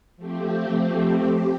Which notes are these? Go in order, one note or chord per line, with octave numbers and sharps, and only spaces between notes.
F3 A3 C4 G4
G4